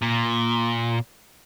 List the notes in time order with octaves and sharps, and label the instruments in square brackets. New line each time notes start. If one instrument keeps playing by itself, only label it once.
[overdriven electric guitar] A#2